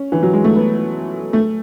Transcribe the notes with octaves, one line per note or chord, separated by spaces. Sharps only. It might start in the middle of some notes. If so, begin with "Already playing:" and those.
Already playing: C#4
E3
F#3
G#3
A3
B3
A3